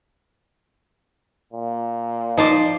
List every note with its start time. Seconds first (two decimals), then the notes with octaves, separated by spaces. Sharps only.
1.53 A#2
2.37 F3 D#4 C5 D5